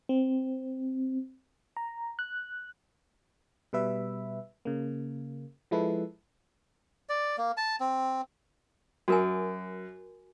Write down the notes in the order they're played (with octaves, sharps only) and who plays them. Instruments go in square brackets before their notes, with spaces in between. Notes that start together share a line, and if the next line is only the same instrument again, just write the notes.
[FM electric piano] C4
A#5
F#6
B2 G3 B4 E5
C#3 A#3
F3 G#3 E4 A4 B4
[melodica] D5
A#3
A5
C4
[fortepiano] F#2 [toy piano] F#4 A#4 G#5